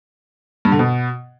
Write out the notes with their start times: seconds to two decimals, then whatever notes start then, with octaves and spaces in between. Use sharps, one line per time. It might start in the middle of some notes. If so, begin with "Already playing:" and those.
0.65 G2
0.72 D3
0.79 B2